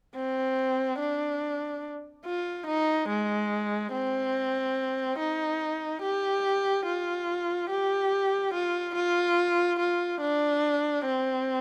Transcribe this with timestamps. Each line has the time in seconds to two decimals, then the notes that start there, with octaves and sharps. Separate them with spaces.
0.15 C4
0.99 D4
2.25 F4
2.67 D#4
3.09 G#3
3.93 C4
5.19 D#4
6.02 G4
6.86 F4
7.70 G4
8.54 F4
8.96 F4
9.80 F4
10.21 D4
11.05 C4